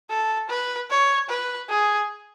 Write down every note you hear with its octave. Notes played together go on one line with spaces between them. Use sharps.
A4
B4
C#5
B4
G#4